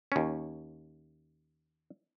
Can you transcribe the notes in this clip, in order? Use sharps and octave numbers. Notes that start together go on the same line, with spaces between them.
D#2 C#4